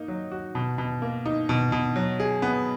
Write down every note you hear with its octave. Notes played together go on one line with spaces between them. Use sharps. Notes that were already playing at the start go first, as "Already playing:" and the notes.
Already playing: A#3 D#4
F#3
F#4
B2
B2
A#3
D#4
B2
B2
F#3
G#4
B3